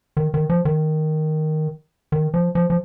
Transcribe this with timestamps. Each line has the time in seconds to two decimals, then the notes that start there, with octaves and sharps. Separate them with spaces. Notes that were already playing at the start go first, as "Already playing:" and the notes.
0.17 D#3
0.34 D#3
0.49 F3
0.65 D#3
2.12 D#3
2.34 F3
2.55 F3
2.70 F3